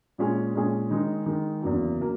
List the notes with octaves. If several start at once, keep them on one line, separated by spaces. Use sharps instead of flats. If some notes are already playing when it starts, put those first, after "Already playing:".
A#2 G#3 C#4 G#4
A#2 G#3 C#4 G#4
D#3 G#3 D#4
D#3 G#3 D#4
E2 C#3 F#3 A#3
C#3 F#3 A#3